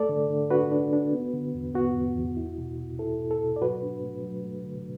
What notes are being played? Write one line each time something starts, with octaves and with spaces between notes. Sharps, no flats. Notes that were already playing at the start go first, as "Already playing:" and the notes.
Already playing: A3 A4 D5
D3
D3
D4 F#4 B4
D4
D4
B3
D3
E2
B3 F#4
E2
E2
E4
B2
B2
E4 A4
B2
A4
B2
D5
F#3 F#4 B4
D4
A3
F#3
A3
D3